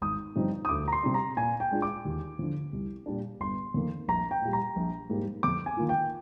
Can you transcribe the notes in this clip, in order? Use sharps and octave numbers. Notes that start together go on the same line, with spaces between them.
G#1 D#6
G2 F3 C4 D#4
D#6
D2 D6
A#5
C6
C3 G3 D4
A#5
A#2 G#5
G5
G#3 D4 F4
D6
D#2
D3 F3
C2
A#2 G3 D4
G1 C6
F2 D#3 A#3
A#1 A#5
G5
A#2 G3
A#5
A#1
G#2 G3 A#3
F2 D6
G#5
D#3 A#3 F4
G5